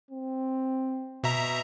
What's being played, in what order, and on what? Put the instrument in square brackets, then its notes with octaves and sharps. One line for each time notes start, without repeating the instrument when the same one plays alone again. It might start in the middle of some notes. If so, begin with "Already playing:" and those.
[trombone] C4
[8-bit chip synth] B2 E5 A#5